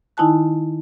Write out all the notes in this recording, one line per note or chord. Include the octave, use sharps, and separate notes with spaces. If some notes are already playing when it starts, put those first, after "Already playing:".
D#3 D#4 E4 G#5 A5 F#6